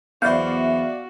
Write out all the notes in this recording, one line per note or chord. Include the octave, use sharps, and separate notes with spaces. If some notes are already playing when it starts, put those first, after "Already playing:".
B1 E2 B3 F#4 C5 D5 E5 F5